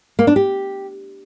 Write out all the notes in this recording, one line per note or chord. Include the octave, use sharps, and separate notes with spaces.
A#3
D4
G4